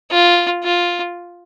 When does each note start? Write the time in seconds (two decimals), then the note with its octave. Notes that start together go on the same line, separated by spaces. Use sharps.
0.11 F4
0.63 F4